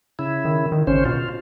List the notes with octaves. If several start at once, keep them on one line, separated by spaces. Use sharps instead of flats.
C#3 E4
D#3
D#3
G#1 C#3 C#4 C5
B2 F4